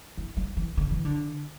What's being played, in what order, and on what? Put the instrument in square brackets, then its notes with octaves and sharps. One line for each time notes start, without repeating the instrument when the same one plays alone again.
[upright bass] E3
G3
E3
D3
E3
D3